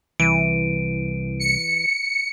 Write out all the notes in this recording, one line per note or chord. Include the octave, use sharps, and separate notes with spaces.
C2 E3 D7 D#7
C#7